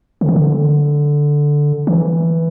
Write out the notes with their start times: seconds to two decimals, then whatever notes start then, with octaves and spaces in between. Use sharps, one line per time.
0.21 D3
0.28 D#3
0.36 D3
1.87 E3